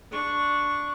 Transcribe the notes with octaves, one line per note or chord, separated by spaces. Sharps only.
D4 C#6